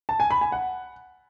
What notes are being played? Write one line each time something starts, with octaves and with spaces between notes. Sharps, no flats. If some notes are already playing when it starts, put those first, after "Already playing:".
A5
G#5
B5
G#5
F#5